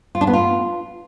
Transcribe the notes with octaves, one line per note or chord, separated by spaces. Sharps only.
F4
D4
B3
F4